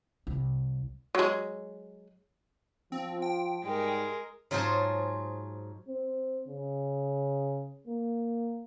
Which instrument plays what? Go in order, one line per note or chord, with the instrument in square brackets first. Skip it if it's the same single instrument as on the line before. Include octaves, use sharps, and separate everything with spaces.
[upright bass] C2
[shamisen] F#3 G#3
[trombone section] F3 [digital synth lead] C4
[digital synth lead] G5
[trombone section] G#2 G3 [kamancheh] G#3 A#4
[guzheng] G#2 F#3 F4 G#4 C5 A5
[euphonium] C4
C#3
A#3